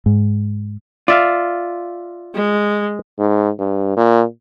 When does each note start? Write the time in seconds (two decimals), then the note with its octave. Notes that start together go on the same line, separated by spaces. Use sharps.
0.06 G#2
1.08 F4 D5 E5 F5
2.34 G#3
3.19 G#2
3.59 G2
3.97 A#2